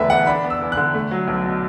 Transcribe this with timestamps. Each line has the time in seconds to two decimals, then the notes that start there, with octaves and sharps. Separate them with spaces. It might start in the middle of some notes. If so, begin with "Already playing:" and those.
Already playing: E1 D3 A3 B4 E5
0.10 E2 F#5
0.27 D4 B5
0.44 B3
0.50 E6
0.61 E2
0.72 F#6
0.77 D3
0.94 A3
1.11 F#3
1.28 B1
1.45 B2